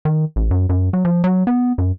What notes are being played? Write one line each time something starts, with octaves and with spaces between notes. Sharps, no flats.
D#3
A1
F#2
F#2
F#3
F3
F#3
B3
F#2